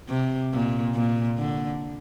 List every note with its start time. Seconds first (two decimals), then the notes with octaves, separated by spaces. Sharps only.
0.09 C3
0.53 A#2
0.95 A#2
1.38 D3